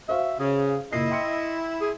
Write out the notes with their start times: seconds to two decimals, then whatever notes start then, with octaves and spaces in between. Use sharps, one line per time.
0.09 F#4 C5 E5 F5
0.40 C#3 G#4
0.93 F#1 A#2 E4 D#5 C7
1.11 G5 C6 C#7
1.81 G#4